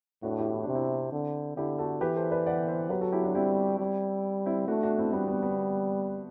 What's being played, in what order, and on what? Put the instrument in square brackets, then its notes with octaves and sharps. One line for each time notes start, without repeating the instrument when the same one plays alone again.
[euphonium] A2 [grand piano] D4 F#4
[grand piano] E4 G4
E4
[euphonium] C3 [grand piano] D4
[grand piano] C4 E4
[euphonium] D3
[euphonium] D3 [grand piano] E4 G4
[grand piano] F#4 A4
[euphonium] E3 [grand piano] G4 B4
[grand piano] A4 C5
B4 D5
D5 F#5
C5 E5
[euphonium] F#3 [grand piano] G4 B4
[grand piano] F#4 A4
E4 G4
D4 F#4
[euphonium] G3 [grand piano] C4 E4
[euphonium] G3
[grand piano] C4 E4
[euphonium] A3 [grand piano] D4 F#4
[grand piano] D4 F#4
C4 E4
[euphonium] G3 [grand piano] B3 D4
[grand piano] B3
B3